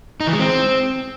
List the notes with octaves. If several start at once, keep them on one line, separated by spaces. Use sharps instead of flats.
D#4
E3
G#3
C4